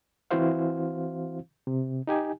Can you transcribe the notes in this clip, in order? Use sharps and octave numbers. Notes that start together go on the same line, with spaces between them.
E3 C4 E4 F#4 C5 F5
C3
D#4 G4 G#5